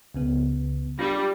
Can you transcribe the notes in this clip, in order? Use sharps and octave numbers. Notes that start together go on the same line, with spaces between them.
C#2 C#3 B3
G3 D4 F4 A#6